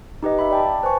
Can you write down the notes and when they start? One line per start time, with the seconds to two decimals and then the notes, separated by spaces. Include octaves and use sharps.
0.23 D#4 G4 B4 D#5
0.39 E5 B5
0.51 D5 G5 A5
0.83 B4 C5 G#5 A5 C#6